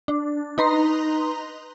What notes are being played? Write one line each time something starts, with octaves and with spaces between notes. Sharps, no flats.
D4
D#4 B4 A#5 C6